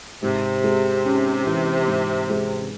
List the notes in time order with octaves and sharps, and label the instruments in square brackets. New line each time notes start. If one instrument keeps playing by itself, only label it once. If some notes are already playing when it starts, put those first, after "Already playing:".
[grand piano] G#2 [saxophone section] C3
[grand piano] G#3
C#4
E3
G#2
G#3